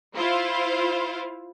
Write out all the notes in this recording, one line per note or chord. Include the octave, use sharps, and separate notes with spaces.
E4 F4 C5 F5